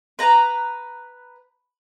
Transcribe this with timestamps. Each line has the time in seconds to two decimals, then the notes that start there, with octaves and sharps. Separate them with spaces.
0.19 B4 A#5